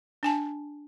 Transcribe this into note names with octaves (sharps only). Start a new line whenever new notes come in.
D4 G#5 A5